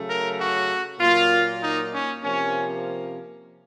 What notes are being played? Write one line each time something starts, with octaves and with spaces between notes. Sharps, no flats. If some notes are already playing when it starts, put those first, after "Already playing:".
Already playing: C#3 F#3 A3
A#4
F#4
A#2 F#3 A#3 F4
D#4
C#4
C3 F3 A#3 C#4